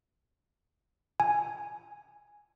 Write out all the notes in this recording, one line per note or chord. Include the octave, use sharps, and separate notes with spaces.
G#5